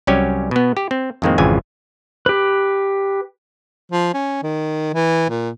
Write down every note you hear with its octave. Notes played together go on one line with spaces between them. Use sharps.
C2 F#3 G3 C#4 G4 G#5
B2 B3
G4
C4
F2 A2 D#3 G#3 A#3 C4
G#1 F2 C#3 E3 F4 G#5
G4 B4
F3
C#4
D#3
E3
A#2